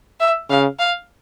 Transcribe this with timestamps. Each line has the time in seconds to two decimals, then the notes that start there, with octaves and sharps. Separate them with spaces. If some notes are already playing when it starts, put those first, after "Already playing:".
0.20 E5
0.49 C#3 F5
0.79 F5